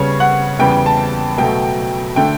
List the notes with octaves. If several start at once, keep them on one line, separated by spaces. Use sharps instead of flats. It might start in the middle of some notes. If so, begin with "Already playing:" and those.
Already playing: C#3 G3 B3 C#5
F#5
E2 C#3 G3 B3 G5
G5
A5
B2 F#3 A3 G5
D3 A3 G5